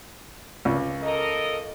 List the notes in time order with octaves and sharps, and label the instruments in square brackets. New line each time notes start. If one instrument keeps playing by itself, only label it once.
[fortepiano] C#2
[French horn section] A4 A#4 D#5